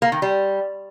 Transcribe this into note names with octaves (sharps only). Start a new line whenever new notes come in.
A#3
D#3
G3